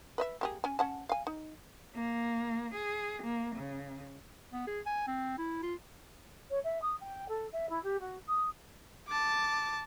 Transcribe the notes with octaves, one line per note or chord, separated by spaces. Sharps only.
B4 D#5 E5
A#3 G4 G#4
C#4 G#5
C#4 F#5 A5
F5 G#5
D#4
A#3
G#4
A#3
C#3
B3
G#4
G#5
C4
E4
F4
C#5
E5
D#6
G5
A4
E5
E4
G4
F#4
D#6
A5 D6